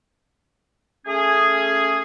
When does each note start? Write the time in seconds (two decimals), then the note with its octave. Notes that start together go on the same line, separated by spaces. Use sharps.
1.06 A3 C#4 G#4